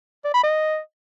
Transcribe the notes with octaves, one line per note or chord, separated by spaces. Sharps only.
D5
B5
D#5